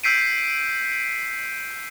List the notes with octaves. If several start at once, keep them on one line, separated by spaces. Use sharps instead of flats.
E6 G6 B6 C7 D7 D#7